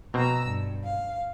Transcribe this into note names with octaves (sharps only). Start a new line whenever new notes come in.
B2 C4 A#5 E6
G2
F5